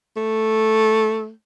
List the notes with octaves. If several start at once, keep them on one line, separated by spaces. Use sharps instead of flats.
A3